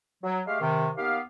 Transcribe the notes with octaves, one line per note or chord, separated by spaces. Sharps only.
F#3
G#3 A3 G4 F5
C3 D#3
D#2 B3 G4 F5